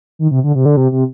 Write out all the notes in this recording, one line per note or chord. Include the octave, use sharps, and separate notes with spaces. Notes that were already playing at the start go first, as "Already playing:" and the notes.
D#3
C3
D3
C3
D3
C3
C3